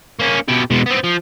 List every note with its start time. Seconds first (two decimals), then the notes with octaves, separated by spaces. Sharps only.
0.20 A#3 C#4
0.48 B2 G4
0.71 B2 G#3
0.86 B3 C4
1.04 F3